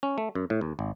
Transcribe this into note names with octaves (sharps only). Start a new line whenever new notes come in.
C#4
A3
F#2
A2
D#2
G#1